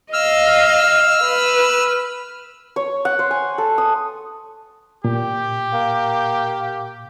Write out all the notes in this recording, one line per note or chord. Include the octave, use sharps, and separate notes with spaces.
D#5 F5 E6 F6
B4
C#5
F#5
C5
G#5
A4
D#6
A#2 G4
A#3